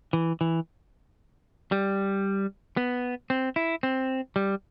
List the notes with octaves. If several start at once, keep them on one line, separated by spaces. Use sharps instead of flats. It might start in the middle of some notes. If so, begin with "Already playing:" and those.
E3
E3
G3
B3
C4
E4
C4
G3